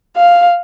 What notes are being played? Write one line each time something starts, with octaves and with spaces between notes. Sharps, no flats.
F5